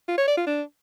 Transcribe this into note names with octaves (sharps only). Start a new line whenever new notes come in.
F4
C#5
D5
F4
D4